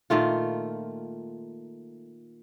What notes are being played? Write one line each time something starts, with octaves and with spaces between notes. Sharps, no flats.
A#2 D#3 A3 F4